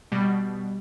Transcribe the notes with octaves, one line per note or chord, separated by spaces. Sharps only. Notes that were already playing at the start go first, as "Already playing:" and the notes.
B2 G3